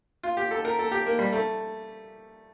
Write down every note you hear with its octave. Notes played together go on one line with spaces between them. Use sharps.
F4
G4
A4
A#4
A4
G4
A#3
G3
A3